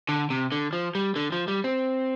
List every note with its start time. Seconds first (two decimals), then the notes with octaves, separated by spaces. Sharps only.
0.09 D3
0.30 C3
0.52 D3
0.73 F3
0.95 G3
1.16 D3
1.32 F3
1.48 G3
1.64 C4